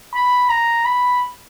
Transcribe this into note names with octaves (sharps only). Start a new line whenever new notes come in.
B5
A#5
B5